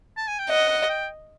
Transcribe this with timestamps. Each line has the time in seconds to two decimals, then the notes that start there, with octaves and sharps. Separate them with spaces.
0.17 A5
0.28 G#5
0.39 G5
0.50 D#5 F#5
0.69 F#5
0.89 G5